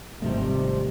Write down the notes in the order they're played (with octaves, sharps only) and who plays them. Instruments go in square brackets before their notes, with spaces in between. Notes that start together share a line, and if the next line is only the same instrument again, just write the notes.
[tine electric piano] G#1 A3 [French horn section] C3 [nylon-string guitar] D#3 F3 G3